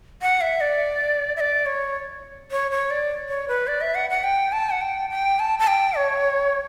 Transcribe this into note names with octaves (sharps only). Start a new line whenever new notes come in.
F#5
E5
D5
E5
D5
C#5
C#5
C#5
D5
C#5
B4
D5
E5
F#5
F#5
G5
A5
F#5
G5
G5
A5
A5
G5
C#5